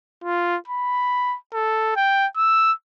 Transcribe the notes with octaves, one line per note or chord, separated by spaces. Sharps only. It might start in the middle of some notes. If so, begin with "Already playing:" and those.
F4
B5
A4
G5
E6